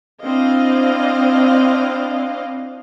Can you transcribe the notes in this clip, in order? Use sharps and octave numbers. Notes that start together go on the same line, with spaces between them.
C4 D4 E4 D#5 F5